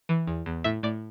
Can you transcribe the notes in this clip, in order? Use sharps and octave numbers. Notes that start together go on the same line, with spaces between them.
E3
E2
E2
A2 E5
A2 D5